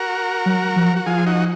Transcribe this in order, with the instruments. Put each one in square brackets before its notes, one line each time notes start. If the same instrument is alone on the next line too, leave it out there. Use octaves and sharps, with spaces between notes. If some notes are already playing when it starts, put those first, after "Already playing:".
Already playing: [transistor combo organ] F#4 A#4
[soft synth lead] F#3
F3
[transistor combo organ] F#4
[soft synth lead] F3 [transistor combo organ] F4 G#4
[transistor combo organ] D#4 F#4